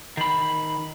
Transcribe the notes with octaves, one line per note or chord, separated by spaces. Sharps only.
D#3 B5